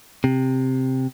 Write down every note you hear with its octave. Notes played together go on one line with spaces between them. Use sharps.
C3